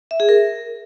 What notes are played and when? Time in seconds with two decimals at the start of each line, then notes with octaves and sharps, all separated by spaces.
0.11 E5
0.20 G#4
0.29 A#4